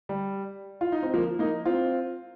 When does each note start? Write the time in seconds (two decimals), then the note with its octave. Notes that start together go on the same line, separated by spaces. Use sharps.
0.09 G3
0.81 F4
0.92 D#4
1.03 C4
1.14 F3 A#3
1.39 A#3 D#4
1.65 C4 F4